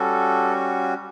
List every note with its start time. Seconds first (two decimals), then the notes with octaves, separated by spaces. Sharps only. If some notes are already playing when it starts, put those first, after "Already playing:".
Already playing: G3 C#4 F#4 A4